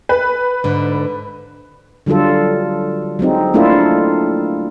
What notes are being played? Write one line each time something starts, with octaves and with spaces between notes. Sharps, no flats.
B4
G#2 D3
D3 F#3 G3 F4 A4
F#3 G#3 C4 D#4
A3 A#3 D4 E4 F4 A4